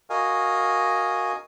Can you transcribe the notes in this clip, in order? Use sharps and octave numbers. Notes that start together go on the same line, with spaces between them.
F#4 A#4 D#5 F5 G#5